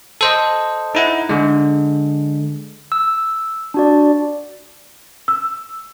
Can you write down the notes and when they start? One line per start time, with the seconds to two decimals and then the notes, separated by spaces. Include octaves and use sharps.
0.21 A4 C5 D#5
0.95 D#4 E4 F#5
1.29 D3 G#3
2.92 E6
3.74 D4 F#4 D5
5.28 E6